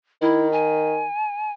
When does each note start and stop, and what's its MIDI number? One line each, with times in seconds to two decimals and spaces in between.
0.22 1.04 51
0.22 0.50 64
0.52 1.52 80